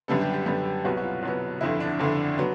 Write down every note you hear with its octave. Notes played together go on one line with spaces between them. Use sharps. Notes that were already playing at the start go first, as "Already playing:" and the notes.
F#2 D3 G3 B3 A4
G4
G4
F#2 D3 G3 B3 G4
G4
C2 B2 F#3 B3 F#4
F#4
F4
C2 B2 F#3 B3
G1 F2 D3 E4
D4
G1 F2 D3
F#3 B3